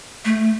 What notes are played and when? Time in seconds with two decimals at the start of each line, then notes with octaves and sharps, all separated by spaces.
0.25 A3